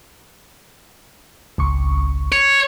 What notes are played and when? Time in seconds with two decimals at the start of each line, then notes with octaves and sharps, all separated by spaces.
1.58 G#1 C#2 C#6
2.32 C#5